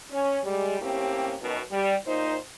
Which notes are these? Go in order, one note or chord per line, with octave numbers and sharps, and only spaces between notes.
C#4
G3 G#3
A2 A#3 C4 C#4 G4
F#2 B2 D#3
G3
A#2 D#4 C5